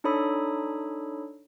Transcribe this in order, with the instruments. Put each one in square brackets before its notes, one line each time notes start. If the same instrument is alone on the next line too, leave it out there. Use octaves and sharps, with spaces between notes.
[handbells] D4 D#4 A4 C#5 B5 D#6